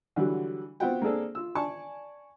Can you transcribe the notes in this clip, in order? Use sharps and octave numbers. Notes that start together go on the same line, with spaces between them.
D3 E3 F#3 G3
B3 C4 F4 F#4 F#5 G5
A#3 C4 D4 G#4 A4
F4 E6
D5 G#5 A5 C#6